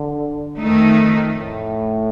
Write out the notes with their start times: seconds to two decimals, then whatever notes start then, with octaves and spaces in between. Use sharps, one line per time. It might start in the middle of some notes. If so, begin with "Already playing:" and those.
Already playing: D3
0.60 F2 D#3 A3 D#4
1.41 A2